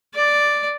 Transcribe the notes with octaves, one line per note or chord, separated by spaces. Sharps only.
D5